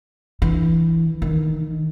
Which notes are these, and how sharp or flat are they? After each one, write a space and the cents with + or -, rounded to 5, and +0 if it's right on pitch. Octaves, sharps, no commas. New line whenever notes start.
E3 +0 D4 +10
D#3 +0 D4 +35